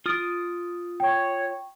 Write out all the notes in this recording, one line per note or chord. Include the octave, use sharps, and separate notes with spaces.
F4 D#6 F6 A6 D7
C#5 G5 C#6